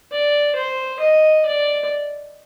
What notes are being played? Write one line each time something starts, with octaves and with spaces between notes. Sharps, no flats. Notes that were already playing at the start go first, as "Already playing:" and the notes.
D5
C5
D#5
D5